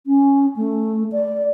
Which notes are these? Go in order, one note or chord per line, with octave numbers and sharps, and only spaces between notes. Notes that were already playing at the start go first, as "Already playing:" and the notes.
C#4
A3
D5